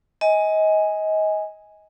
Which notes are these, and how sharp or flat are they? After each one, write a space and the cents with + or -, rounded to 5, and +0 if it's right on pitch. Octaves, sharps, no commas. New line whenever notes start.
D#5 +25 G#5 -5